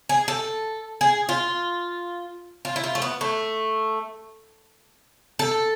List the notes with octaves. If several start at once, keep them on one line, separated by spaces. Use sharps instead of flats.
G#4
A4
G#4
F4
F4
E4
F4
A3
B3
A3
A4